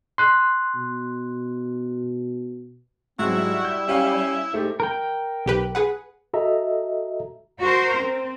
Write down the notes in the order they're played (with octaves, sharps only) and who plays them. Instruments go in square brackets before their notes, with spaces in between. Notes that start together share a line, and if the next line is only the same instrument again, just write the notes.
[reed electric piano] C6 F#6
[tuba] B2
[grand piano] G#2 F#3 [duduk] C4 [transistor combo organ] E4 [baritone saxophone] F#4
[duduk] G3
[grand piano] G6
[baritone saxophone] C#4 [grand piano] G4 F5
[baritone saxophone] G#2 [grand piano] A3 [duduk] G4
[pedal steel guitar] A#4 G5
[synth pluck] B1 G4 B4
G#4 B4 F#5
[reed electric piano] F#4 A4 D#5 E5 A#5
[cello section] F#4 A#4 C5
C4